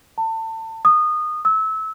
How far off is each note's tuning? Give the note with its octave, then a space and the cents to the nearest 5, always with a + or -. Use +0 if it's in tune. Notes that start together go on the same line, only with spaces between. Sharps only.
A5 +30
D#6 -20
E6 -25